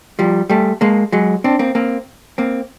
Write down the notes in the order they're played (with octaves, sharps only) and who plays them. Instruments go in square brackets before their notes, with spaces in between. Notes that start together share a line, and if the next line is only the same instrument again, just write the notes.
[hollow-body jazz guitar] F3 G3
G3 A3
G#3 A#3
F#3 G#3
C4 D4
A#3 C4
A#3 C4
A#3 C4